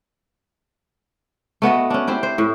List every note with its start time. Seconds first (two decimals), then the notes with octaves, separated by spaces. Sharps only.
1.62 A3 B3 F#4 D#5
1.90 C#4 D4
2.08 C4 E4 G4
2.23 C5
2.38 A2